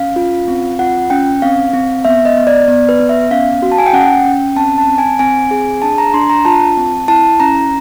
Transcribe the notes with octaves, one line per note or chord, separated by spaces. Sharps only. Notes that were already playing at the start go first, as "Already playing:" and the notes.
Already playing: C#4 F5
F4
C4
F4 F#5
C#4 G5
C4 F5
C4
B3 E5
D#5
B3
D5
B3 D5
B4
B3
E5
C#4 F5
F#4
A5
G#5
G5
C#4 F#5
C#4 G5
C4 A5
A5
C4
G#5
C4 G#5
G#4
D4 A5
A#5
D4 C6
A#5
F4 A5
C4
E4 A5
C#4 A#5